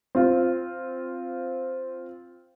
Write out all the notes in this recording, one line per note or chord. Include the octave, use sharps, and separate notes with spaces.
C4 F4